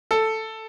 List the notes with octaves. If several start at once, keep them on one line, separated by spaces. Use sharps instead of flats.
A4